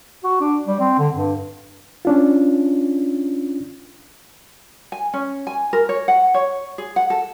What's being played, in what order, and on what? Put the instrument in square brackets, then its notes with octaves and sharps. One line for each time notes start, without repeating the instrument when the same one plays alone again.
[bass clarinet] F#4
D4
G3
C4
D3
G2
[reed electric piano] C#4 D4 F4
[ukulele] G#5
C#4
G#5
A#4
C#5
F#5
C#5
G#4
F#5
A4